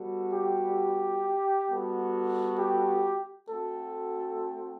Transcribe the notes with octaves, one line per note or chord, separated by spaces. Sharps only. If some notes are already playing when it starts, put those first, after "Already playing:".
Already playing: G3 B3 F#4 A4
G4
G3 B3 F#4 A4
G4
A3 C4 F#4 A4